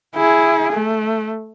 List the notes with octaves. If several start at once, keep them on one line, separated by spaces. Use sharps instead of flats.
E4 G#4
A3